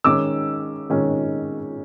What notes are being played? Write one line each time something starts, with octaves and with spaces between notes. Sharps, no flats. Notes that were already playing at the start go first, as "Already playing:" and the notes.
D#3 G#3 C#4 D6 E6
D#3 G#3 C#4